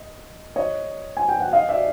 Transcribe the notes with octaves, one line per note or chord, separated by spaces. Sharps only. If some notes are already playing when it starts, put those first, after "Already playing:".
Already playing: D#5
C#5 D#5
G#5
G5
F#5
D#5 F5
D5 E5